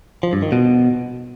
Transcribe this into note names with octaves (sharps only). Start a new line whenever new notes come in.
F3
G2
D#3
B2